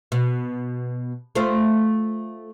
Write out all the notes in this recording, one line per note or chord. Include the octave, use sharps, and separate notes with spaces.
B2
A3 F4 C5